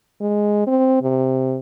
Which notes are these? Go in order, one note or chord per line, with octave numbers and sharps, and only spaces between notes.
G#3
C4
C3